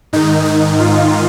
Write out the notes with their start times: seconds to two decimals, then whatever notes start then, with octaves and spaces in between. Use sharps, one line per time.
0.13 G#2 D#3 D#4
0.45 D#4
0.80 F4